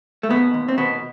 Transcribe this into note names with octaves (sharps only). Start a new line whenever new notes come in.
A3
D#2 B2 B3
D#2
C4
D#2 B2 B3